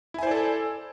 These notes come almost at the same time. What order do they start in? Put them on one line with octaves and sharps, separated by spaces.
E4 G#5 C5 D5 A4